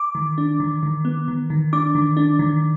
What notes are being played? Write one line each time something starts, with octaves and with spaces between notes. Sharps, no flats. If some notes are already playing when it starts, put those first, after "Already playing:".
Already playing: D6
D#3
D4
D#3
D#3
B3
D#3
D#3
D4 D6
D#3
D4
D#3